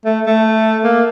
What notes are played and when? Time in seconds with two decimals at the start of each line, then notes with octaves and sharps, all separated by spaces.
0.05 A3
0.27 A3
0.84 A#3